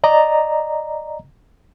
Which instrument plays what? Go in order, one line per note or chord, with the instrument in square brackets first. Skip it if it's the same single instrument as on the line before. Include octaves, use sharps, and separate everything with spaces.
[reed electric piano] D5 D#5 A#5